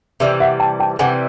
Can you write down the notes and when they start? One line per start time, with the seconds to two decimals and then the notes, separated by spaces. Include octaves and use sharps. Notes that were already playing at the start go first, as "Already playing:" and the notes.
0.20 C3 E3 G3 D5 E5
0.40 E5 F#5
0.60 G5 A5
0.80 G5 A5
0.99 C3 E3 G3 F#5 G#5